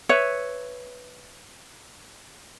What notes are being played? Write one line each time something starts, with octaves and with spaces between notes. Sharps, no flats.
B4 C#5 E5